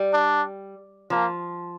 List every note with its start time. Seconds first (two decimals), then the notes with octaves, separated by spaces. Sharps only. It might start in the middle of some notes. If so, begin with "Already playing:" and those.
Already playing: G3
0.13 D4
1.10 F3 A#3